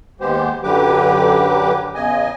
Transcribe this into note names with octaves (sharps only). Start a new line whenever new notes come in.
D#2 G#3 B3 G4 C5
F#2 D3 F#3 G4 B4 D6
E2 C#3 D#5 G#5